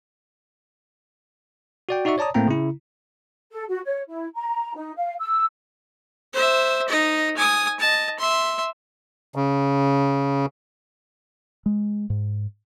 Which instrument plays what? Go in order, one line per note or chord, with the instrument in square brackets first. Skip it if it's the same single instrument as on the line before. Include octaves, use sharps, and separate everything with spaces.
[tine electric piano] F#4 D5 G5
D#4 F#4 D5 E5 C#6
C#5 D5 A5 A#5 D#6
A2 A3 A#3 C4 G5 A#5
C#3 E4
[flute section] A4
F#4
C#5
E4
A#5
D#4
F5
E6
[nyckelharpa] C5 E5
D#4 D#5
G#5 D#6
D#5 A5
E5 C6
[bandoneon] C#3
[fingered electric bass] G#3
G#2